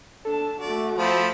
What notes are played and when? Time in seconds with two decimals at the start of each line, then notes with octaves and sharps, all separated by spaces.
0.25 D4 A4 A5
0.61 A3 F#4 D5
0.99 F3 C4 A5 B5